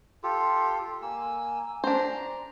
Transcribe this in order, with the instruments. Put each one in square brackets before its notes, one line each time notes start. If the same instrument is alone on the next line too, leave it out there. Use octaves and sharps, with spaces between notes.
[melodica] F4 G4 A4 [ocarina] C6
[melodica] A#3 E6 [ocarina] G#5
[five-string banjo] D4 C5 [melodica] A#5